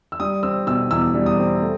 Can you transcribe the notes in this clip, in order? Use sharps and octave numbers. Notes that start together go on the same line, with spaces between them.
E6
G3 D#6
C4 E6
B2 E6
E2 E6
G3
D#6
C4
A3